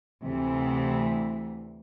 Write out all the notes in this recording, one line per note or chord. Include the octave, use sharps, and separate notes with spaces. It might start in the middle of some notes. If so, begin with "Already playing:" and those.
D2 C3 E3